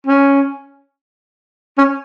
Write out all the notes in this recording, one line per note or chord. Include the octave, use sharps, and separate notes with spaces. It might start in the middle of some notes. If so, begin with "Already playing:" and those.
C#4
C#4